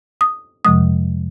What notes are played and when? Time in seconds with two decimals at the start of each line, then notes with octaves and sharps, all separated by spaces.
0.21 D#6
0.65 F2 C3 F3 G#3 D#6